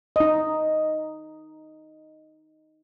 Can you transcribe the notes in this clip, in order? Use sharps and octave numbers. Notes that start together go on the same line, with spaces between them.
D#4 D#5